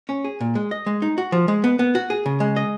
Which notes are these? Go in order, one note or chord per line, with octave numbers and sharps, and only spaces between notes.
C#4
G#4
A#2
G#3
D#5
G#3
D#4
F#4
F3
G#3
B3
B3
F#4
G#4
C#3
G#3
D#5